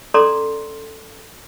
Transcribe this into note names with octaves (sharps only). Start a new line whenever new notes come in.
C#4 A4 D5 A#5 C6 D6